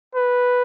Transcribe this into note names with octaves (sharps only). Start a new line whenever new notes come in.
B4